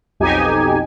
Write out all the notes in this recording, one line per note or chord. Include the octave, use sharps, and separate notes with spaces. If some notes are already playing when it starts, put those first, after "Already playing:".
B1 F2 D#4 G4 G#5